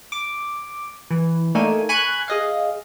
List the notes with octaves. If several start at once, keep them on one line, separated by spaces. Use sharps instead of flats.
D6
E3
A3 A#3 D4 D#4 A4 G#5
G#5 B5 C#6 F#6 G#6
G#4 D#5 F5